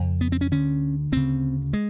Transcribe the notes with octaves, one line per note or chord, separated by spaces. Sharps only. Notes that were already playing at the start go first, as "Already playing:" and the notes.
Already playing: F2 C#3
B3
C4
C#4
D2 D3 C#4
D2 C#3 C4
G#3